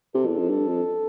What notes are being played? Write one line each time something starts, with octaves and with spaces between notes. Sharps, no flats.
C3 A4
E2
F2
G2 A4
F2